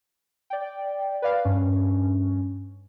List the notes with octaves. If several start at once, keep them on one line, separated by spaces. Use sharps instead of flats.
D5 G5
B4 D5 F5
G2 C#4